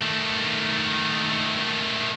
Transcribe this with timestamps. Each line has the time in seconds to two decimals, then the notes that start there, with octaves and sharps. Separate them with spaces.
0.02 D#3 A3